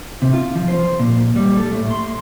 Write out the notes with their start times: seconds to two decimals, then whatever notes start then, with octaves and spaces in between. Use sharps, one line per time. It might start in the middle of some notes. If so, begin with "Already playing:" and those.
0.22 C3
0.33 F4
0.55 F3
0.68 C5
1.00 A#2
1.36 G3
1.57 A4
1.72 A2
1.91 C6